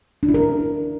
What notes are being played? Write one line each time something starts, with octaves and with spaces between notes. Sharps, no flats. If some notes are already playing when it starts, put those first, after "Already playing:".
D4
E4
A#4